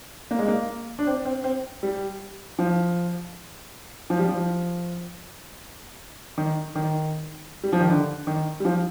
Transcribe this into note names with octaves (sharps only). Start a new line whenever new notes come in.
A#3
G#3
A#3
D4
C4
C4
C4
G3
F3
F3
G3
F3
D#3
D#3
G3
F3
D#3
D3
D#3
G3
F3